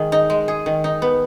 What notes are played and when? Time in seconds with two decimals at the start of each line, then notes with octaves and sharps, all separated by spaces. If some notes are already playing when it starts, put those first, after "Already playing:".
Already playing: D#3 G#3 G#4
0.12 D#4
0.30 G#3
0.48 G#4
0.66 D#3
0.84 D#4
1.02 B3